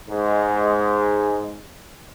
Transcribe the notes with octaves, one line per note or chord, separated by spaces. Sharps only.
G#2 G#3